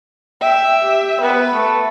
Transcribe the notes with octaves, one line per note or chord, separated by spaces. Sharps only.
E5 G5
G4
B3 B4
A3